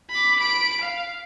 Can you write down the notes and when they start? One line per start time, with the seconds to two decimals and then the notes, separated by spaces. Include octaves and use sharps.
0.11 B5 D6
0.39 B5 D7
0.81 F5